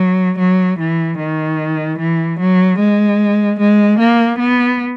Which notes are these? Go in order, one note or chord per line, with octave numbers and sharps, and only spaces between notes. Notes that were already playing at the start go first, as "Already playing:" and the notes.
Already playing: F#3
F#3
E3
D#3
E3
F#3
G#3
G#3
A#3
B3